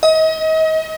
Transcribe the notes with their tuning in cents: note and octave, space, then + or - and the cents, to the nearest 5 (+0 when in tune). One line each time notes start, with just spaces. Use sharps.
D#5 +35